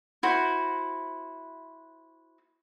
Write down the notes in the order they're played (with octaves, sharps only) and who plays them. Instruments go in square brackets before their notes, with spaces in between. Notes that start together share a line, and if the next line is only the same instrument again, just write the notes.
[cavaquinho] E4 F#4 C5